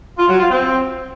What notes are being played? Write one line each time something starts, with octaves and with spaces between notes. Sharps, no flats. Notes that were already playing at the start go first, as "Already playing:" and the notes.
F4
F#3
F4
C4